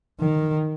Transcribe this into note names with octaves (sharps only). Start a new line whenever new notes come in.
D#3